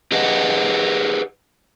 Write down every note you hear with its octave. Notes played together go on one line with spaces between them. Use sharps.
G4 G#4 B4 D#5 F#5